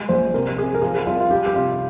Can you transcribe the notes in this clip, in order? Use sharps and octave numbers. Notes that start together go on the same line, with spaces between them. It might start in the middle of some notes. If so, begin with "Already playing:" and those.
Already playing: G3 G#3
A#1 C5
C3 A#4
C4 G#4
A#4
F3 G#4
C2 F4
F4
G3 G4
G4
C3 F4